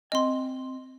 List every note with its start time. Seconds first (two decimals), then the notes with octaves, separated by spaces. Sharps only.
0.12 C4 D#5 G#5 C6